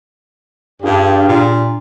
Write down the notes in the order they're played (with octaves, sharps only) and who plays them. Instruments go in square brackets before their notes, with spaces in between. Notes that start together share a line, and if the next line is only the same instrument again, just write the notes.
[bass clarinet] G2 [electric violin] D4 [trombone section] F4 G4 G#4
[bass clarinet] A#2